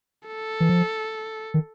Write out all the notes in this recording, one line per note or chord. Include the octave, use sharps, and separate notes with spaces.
A4
E3
F3
D#3